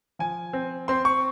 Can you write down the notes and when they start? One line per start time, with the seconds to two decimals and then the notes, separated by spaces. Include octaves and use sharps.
0.19 F3 G#5
0.53 C4
0.88 C4 C6
1.05 C#6